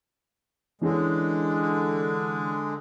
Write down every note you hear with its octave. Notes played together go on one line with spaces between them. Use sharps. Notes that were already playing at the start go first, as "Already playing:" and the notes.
D3 E3 G#3 C#4 G#4